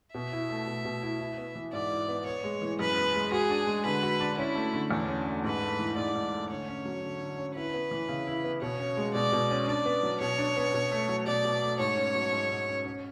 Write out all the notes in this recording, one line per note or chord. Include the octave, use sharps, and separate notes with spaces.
B2 E5
E4
A3
B2
B2
E4
E4
B3
E3
G#2 D5
E4
B3
B3 C#5
G#3
E3
F#2 B4
B3
G#3
F#4 G#4
D4
G#3
D3 B4
F#4
D4
C#4 E4
A3
D3
E2 D4
C#4
A3
G#2 B4
A3
E3
G#2 D5
G#2
A3
D3 C#5
C#4
F#3
D3
D3
C#4
E4 B4
B3
E3
C#3
E4
B3
B2 C#5
C#4
G#3
B2 D5
B2
C#4
D4 D5
B3
F#3
B2 C#5
D4
B3
B2
A3
F#3
B2 D5
B2
A3
G#2 C#5
C#4
F#3
G#2
G#2
C#4
C#4